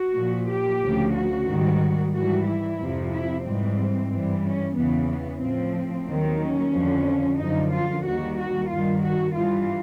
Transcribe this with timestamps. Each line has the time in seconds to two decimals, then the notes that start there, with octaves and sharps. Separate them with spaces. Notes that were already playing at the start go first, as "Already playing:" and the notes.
Already playing: F#4
0.15 A#2 F3
0.48 G4
0.81 D2 C#3 F3
1.14 F#4
1.47 G#2 D#3 G3
2.13 G#2 E3 G3 F#4
2.45 E4
2.78 F2 C3 F3
3.11 E4
3.44 G#2 E3 G3 C4
4.10 G2 E3 G3
4.43 C#4
4.75 E2 C#3 E3 B3
5.08 B3
5.41 A2 F3 C4
6.06 D#2 D#3 F#3
6.40 C#4
6.73 F2 D3 F3
7.38 F#2 D3 F3 D#4
7.71 F4
8.04 D#2 D#3 G3 F#4
8.37 F#4
8.69 G2 D#3 G3 F4
9.02 F#4
9.36 G2 E3 G3 F4